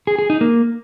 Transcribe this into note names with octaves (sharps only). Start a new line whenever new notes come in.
G#4
G#4
D#4
A#3